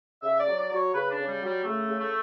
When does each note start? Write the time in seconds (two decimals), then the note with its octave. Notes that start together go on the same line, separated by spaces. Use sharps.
0.22 C#3 E5
0.40 D5
0.46 F#3
0.58 D5
0.69 F#3 D5
0.75 C#5
0.93 C#3 B4
1.10 D4
1.17 C#3
1.28 G3
1.40 F#3
1.46 G3
1.63 C#3 A3
1.88 C#3
2.00 A3